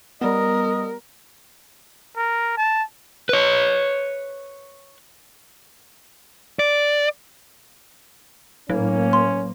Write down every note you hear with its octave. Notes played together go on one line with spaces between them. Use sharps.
G3 B3 A#4 D#5
A#4
A5
B4 C#5
D5
A2 F#3 A#3 C#4
C6